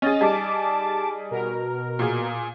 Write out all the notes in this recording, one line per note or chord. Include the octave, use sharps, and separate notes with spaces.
C#4 G#4 D#5 A6
G3 D#4 G#4 A5 D6
B2 A#4
A#2 G#4